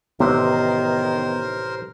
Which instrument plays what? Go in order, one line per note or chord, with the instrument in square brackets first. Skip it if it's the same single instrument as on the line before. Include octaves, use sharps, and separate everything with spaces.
[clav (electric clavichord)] A1 C3 E5 [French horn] D#3 [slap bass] B3 [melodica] A#4 C5